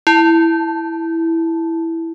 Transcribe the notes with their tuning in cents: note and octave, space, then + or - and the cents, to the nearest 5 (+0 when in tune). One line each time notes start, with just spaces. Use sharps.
E4 +0 A5 +0